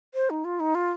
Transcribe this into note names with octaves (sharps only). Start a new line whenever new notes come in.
C5
D#4
F4
D#4
F4